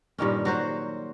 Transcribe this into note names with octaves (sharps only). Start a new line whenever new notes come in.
G2 A#2 D#3 C#4
F#3 F#4 C5